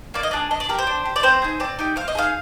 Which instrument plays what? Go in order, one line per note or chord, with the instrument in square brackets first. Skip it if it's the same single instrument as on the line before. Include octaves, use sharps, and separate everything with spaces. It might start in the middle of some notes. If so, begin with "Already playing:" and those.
[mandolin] A#3 D5
D#5
D4 F4 G#4 D5
D4 D#5
D5
G4 A#4
C5
D4
G4
D5
C4 C5
D#4 G#4
C4 D5
D#4 G4
C4 F5
D#5
D#4 G#4 F5